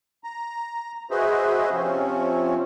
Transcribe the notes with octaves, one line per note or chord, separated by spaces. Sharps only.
A#5
F#4 G#4 B4 C5 D#5 E5
C3 F3 C4 C#4